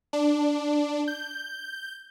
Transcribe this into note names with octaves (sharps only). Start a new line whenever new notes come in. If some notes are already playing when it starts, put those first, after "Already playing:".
D4
G6